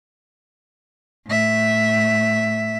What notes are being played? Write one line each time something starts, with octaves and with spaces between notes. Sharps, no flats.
A2 E5